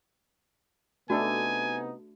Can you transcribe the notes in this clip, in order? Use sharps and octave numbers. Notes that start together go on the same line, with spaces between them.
C3 A3 B3 D4 D#4 F#4 A4 G#5